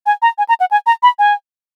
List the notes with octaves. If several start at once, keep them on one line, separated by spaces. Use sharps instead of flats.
G#5
A#5
G#5
A#5
F#5
G#5
A#5
B5
G#5